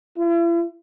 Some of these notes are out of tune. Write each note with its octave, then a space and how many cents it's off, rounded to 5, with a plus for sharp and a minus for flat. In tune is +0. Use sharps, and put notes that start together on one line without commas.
E4 +45